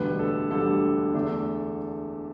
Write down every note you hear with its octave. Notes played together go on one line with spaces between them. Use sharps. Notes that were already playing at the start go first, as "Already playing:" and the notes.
Already playing: E1 D2 D3 G3 B4
A4
E1 D2 D3 G3 A4
E2 D3 A3 D4